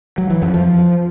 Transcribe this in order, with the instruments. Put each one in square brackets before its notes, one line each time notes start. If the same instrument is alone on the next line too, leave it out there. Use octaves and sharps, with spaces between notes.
[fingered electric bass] F#3
E3
F2
F3